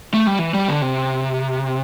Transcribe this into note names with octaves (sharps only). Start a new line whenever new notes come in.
A3
G3
E3
G3
D3
C3